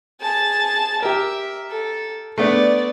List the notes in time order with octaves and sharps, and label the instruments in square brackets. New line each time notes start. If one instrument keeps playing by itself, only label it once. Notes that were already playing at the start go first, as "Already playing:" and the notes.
[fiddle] G#4 A5
[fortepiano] G4 A#4 [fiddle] E5
[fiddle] A4
[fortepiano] A3 B3 D4 [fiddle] D5